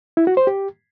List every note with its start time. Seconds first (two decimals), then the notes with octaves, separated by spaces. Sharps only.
0.17 E4
0.27 F#4
0.37 C5
0.47 G4